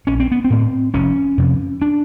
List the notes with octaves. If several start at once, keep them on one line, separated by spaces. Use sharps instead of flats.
A#1 C#4
C4
B3
C4
A2
F1 C#4
F2 C3
D4